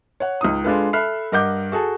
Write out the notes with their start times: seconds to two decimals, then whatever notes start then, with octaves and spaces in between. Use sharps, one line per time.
0.20 C#5 F#5
0.41 C#2 D#4 D#6
0.64 G#3 D4 F4 A4 B4
0.93 A4 E5 B5 F6 F#6 C7
1.32 G2 A#4 D#5 F#5 D6 G6
1.72 F#4 G#4 A4 A5